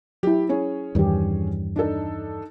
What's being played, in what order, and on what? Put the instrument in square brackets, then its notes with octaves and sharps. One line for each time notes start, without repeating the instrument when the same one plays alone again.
[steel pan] F#3 E4 [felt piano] G4
[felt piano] C#4 G#4 C#5
[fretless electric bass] E2 G2 [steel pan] D#3 G4
[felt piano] D4 D#4 A4